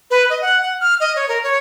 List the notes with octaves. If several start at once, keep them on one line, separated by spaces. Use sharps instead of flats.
B4
D#5
F#5
F#5
F6
D#5
C#5
A#4
C#5